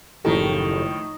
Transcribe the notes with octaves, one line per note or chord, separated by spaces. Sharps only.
F#1 A2 D#3 F3 G4 A4